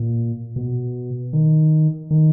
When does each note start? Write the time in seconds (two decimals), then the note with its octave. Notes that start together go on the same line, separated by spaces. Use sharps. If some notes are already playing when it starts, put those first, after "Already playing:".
Already playing: A#2
0.56 B2
1.33 D#3
2.11 D#3